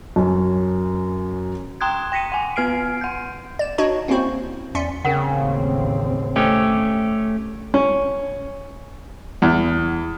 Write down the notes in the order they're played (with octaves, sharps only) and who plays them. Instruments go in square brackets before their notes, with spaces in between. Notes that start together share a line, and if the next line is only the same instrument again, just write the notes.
[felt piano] F#2 C#4
[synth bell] G5 A#5 C6 D#6 F#6 G#6
G5 A#6 B6 C#7 D#7
F#5 G#5
B3 B4 F6 C7 D7
F#5 G6
[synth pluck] D5 E7
D4 D#4 F#4 C#5 D#5
A#3 C4 C#4 E4 F#4 C5
E2 C#4 D5 C6 B6 C#7
[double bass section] A1 D#2 C4 [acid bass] C#3 [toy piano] C#4 A#4 F#5
[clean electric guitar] A3 C#4 G4 [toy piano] A4 C5 D#5
[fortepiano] C#4
E2